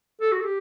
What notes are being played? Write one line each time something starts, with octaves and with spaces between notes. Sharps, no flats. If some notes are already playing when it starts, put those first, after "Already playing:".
A4
F#4
A4
G4